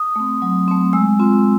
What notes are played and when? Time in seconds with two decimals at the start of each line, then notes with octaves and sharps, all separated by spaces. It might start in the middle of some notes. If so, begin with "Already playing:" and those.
Already playing: D#6
0.16 A3 C4
0.42 F#3
0.68 A3 C4
0.93 G#3 E6
1.19 C4 F4